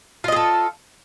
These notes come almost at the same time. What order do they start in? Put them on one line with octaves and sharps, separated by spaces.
F4 D#5 G#4 A4